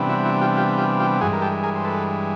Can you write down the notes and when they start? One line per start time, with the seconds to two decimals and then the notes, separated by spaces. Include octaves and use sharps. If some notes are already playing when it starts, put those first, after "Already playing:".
Already playing: C3 E3 G3 B3 D4
0.09 E4 F#4
0.25 E4 F#4
0.41 F4 G4
0.57 F4 G4
0.78 F4 G4
0.99 F4 G4
1.21 G2 E3 G#3 F#4 G#4
1.33 A#4
1.42 G4 A4
1.63 G#4 A#4
1.75 C5
1.85 A4 B4